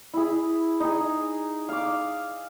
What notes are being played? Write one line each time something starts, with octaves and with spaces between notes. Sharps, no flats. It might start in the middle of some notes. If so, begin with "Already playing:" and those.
E4 G#4
D#4 G#4
F5 D6